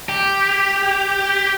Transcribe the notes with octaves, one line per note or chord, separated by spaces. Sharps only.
G4